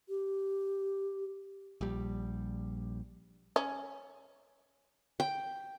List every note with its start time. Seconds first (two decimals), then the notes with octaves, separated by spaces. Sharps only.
0.09 G4
1.81 A#1 G3
3.56 C#4
5.20 G5